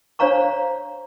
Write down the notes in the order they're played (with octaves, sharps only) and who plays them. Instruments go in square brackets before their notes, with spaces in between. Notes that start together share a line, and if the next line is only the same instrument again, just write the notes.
[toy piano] D4 C5 C#5 F5 A#5 C#6